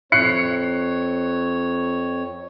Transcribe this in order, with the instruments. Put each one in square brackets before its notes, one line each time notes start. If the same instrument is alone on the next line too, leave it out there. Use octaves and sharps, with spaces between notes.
[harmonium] F2 C#5 [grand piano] F#6 C7 C#7